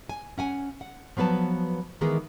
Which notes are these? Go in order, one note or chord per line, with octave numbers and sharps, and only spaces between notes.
G#5
C#4 F#5 G#5
F#5
F3 F#3 B3 B4 A5
D#3 E3 G#3 B3 G#4 A#4